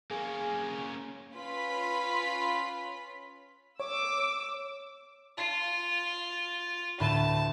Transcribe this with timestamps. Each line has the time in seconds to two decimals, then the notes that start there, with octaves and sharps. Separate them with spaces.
0.11 A#3 C#4 G#4
1.33 C#4 F4 B4 B5 B6
3.80 C#5 D6 E6
5.37 F4 A5 A6 C7
7.00 D2 A2 B4 A5